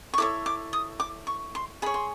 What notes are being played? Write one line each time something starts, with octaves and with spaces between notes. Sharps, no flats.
C#6
E4 A4 C#5 D6
D6
D#6
D6
C#6
C6
G#4 C#5 B5
C6